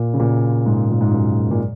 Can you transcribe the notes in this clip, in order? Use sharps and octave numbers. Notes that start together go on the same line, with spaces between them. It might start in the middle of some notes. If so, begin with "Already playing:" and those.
Already playing: A#2
C#3
A#2
G#2
A#2
G#2
F#2
A#2